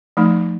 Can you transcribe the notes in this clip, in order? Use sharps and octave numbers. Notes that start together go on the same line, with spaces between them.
F3 A3 D#4